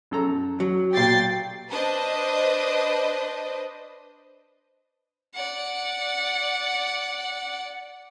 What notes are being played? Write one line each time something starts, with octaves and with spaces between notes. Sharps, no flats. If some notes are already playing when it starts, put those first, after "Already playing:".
F#2 A4 A#5
F#3
A#2 G4 G5 A6 C7
D4 B4 C5 D#5
D5 F#5